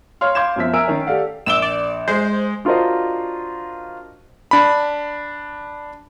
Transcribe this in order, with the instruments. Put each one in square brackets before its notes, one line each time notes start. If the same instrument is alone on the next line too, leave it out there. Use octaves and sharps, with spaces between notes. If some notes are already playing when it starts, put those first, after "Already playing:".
[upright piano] C#5 F5 C6 F6
F5 C6 D6 G6 G#6 E7
F#2 B2 F3 E5 B6
A#4 E5 G#5 E6 D7
D#3 C#4
G4 A4 D5 F5 F#5
[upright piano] A#1 E7 G7 [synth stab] D6 E6
[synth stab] D5
[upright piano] G#3 [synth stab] C5
[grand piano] D4 F4 F#4 A#4 C5 D#5
[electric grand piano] D4 B5